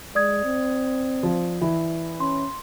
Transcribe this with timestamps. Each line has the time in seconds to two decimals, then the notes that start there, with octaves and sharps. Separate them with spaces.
0.15 G#3 D5 D#6 G#6
0.44 C4
1.23 F3
1.61 E3
2.20 C#4 C6